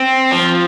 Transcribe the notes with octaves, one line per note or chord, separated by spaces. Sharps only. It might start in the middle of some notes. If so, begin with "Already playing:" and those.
Already playing: C4
F3